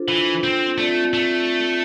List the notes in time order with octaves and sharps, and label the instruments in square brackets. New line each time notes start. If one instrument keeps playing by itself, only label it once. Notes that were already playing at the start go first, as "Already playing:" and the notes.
Already playing: [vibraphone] D4 F4 A4 C5
[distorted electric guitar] E3
C4
[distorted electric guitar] A3 [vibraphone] C4 F4 A4 D5
[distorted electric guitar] A3